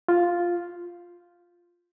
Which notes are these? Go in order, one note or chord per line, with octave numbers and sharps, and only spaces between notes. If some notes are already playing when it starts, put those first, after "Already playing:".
F4